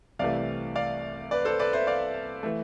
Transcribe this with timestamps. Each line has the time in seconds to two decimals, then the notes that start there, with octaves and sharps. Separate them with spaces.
0.19 C2 C3 E3 A3 D5 F5
0.75 D5 F5
1.31 B4 D5
1.45 A4 C5
1.59 B4 D5
1.73 C5 E5
1.87 D5 F5
2.43 E3 A3